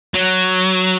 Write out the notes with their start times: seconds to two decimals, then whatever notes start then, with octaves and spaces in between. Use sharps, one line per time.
0.14 F#3